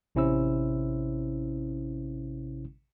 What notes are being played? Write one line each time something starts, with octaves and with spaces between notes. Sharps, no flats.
A1 C3 C#4 E4 C5 E6